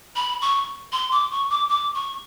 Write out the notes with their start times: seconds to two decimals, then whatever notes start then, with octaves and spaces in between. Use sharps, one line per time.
0.16 B5
0.42 C#6
0.92 C6
1.12 D6
1.31 C#6
1.50 D6
1.69 D6
1.95 C#6